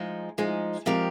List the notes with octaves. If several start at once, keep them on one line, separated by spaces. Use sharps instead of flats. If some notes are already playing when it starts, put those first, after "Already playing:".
Already playing: F3 G#3 D#4
F3 G#3 D#4
F3 G#3 C4 G4 A#4